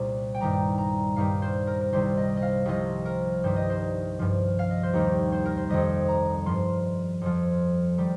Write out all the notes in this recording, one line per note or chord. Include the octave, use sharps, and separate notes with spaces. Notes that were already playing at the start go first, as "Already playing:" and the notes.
Already playing: C2 A#2 G3
G5
G2 D#3 G3 A#5
A#5
G2 D#3 G3 F5
C5
A#4
A#4
C2 C3 D#3 G3 C5
D#5
D#5
F5
C2 C3 F3 D#5
A#4
G2 D#3 G3 C5
D#5
C5
G2 F3
F5
D#5
C5
D#2 D#3 G3 A#4
C5
A#4
C5
F2 D#3 G3 D#5
A#5
G2 F3 C6
F2 F3
D#3 G3